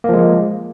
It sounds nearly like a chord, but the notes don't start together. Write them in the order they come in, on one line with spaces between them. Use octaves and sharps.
A#3 F3 G#3